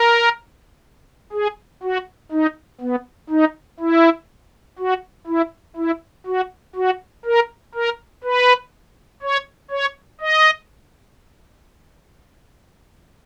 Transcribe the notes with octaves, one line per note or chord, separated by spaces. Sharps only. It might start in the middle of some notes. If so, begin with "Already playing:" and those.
Already playing: A#4
G#4
F#4
D#4
B3
D#4
E4
F#4
E4
E4
F#4
F#4
A#4
A#4
B4
C#5
C#5
D#5